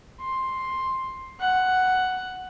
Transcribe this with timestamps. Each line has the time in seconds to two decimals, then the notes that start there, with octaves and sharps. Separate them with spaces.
0.21 C6
1.40 F#5